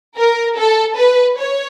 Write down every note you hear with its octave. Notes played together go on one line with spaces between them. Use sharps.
A#4
A4
B4
C#5